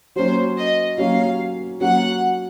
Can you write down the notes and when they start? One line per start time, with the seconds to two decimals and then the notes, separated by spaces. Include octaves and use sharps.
0.16 F#3 A#3 C#4 C5
0.57 D#5
0.98 F#3 A#3 C#4 F5
1.80 F#3 A#3 C#4 F#5